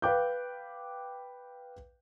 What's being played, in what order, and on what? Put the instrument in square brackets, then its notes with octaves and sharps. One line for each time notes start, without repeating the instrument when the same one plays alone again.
[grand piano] B4 F5 G5 D6 F#6 G6